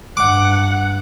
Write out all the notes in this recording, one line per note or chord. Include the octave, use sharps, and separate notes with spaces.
G2 F#5 D6